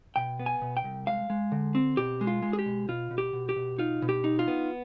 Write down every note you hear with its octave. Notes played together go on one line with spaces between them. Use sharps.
B2 G5
B3
G#5
B2
G5
C2
G#3 F5
G#3
D3
C4
B2 G4
G#3
F4
G#3
G#4
G4
B2
B2 F4
B2
G4
B2
G4
B2
D#4 F4
B2
G4
D#4
F4
B3